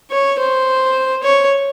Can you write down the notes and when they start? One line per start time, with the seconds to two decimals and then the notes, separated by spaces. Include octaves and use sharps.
0.11 C#5
0.39 C5
1.23 C#5